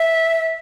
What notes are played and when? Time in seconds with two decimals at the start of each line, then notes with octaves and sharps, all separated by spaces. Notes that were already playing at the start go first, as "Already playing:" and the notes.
Already playing: E5